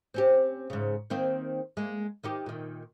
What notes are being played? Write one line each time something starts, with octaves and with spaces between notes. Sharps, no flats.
C4 C#4 G4
G#2 C#3
D#3 A#3 C4
G#3 A#3
D#3 D#4 G4
A#2 D#3